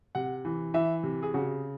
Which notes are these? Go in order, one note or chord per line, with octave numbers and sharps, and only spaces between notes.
C3 F#5
E3
E3 E5
C3
G#4
C#3 F#4